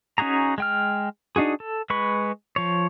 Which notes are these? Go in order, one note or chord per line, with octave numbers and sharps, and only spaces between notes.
C#4 D#4 F#4 G#4 A#5
G#3 G5 F6
D4 D#4 F#4 G#4
A4
G#3 B4 B5 C#6
F3 C#5